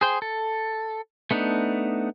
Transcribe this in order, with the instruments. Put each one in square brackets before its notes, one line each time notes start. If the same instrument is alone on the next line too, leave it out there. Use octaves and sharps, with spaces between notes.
[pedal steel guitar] G#4 C5 G5
A4
A3 B3 D4 D#4